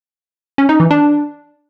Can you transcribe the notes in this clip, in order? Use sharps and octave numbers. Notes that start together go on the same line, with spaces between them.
C#4
D#4
E3
D4